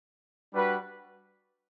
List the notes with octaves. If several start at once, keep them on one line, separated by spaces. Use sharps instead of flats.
G3 D4 F#4 B4